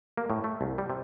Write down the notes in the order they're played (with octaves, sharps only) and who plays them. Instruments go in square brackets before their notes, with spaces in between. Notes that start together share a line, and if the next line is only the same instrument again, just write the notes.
[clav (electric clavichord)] A#3
A2
A3
C2
G3
C3